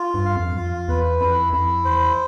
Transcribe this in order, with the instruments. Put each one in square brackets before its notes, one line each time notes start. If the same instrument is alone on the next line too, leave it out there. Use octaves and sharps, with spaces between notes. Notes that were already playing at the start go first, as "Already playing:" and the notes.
Already playing: [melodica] F4
[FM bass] G2
[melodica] F5
[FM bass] F2
G2
[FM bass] F2 [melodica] F4
[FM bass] E2 [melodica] B4
[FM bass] F2 [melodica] E4
[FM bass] F2 [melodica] E4
[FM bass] E2 [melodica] C5